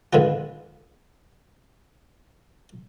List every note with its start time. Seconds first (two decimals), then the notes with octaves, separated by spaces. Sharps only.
0.13 G#2 D3 D#3 B3 F4